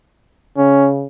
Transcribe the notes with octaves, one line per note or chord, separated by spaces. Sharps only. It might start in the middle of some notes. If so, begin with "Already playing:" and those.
C#3 C#4